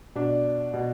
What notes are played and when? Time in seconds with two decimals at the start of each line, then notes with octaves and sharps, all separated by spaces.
0.15 B2 D4
0.74 B2